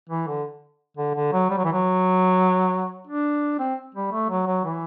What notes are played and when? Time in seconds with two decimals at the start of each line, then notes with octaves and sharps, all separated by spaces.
0.09 E3
0.27 D3
0.97 D3
1.15 D3
1.33 F#3
1.50 G3
1.57 F#3
1.65 E3
1.73 F#3
3.07 D4
3.59 C4
3.95 G3
4.12 A3
4.30 F#3
4.47 F#3
4.65 E3